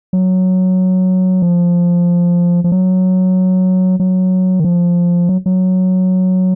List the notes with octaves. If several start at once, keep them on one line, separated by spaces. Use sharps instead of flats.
F#3
F3
F3
F#3
F#3
D#3
F3
F#3
F#3